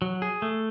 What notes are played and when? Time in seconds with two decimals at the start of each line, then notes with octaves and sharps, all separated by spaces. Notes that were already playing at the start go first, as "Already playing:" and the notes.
0.02 F#3
0.22 G#4
0.42 A3